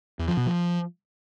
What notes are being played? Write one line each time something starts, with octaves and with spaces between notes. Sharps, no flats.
E2
F3
B2
F3